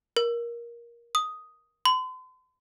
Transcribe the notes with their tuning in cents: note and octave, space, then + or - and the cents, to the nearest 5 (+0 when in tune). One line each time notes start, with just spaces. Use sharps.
A#4 +15
D#6 +5
C6 -45